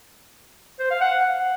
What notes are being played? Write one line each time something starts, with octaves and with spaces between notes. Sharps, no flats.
C5
F5
F#5